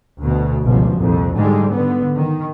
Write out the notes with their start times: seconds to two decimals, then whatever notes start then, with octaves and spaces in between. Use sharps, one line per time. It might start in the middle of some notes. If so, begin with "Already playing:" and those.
0.19 D2 B2
0.64 G1 C#2 B2 F3
0.98 C2 F2 A#2
1.35 G#2 D3 G3 G#3
1.71 D3 B3
2.16 D#3